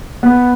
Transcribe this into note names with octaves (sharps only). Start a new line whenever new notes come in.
B3